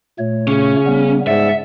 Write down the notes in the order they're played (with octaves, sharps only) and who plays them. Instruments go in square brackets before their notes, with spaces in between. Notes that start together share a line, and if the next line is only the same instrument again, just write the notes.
[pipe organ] A#2 A3 C#5
[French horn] C#3 [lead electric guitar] C#4
[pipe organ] G3 B3
[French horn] G#2 [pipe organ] D5 F#5 [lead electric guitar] E5